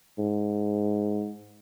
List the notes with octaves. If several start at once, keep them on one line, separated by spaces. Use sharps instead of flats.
G#2